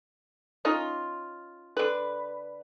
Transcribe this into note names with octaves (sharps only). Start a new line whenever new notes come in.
C#4 D#4 F4
D3 B4